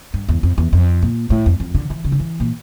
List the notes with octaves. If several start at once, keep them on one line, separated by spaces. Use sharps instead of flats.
G2
E2
F2
E2
F2
A#2
A2
F2
F2
D3
E3
C#3
D3
E3
A#2